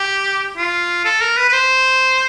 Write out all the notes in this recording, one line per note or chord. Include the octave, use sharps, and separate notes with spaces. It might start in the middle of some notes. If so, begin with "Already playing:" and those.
Already playing: G4
F4
A4
A#4
B4
B4
C5